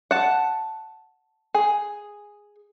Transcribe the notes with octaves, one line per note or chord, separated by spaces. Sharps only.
F#5 A5
G#4